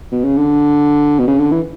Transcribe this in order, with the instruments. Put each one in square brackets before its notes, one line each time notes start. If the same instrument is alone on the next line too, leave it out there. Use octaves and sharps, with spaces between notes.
[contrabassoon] B2
C#3
D3
B2
C#3
D3
E3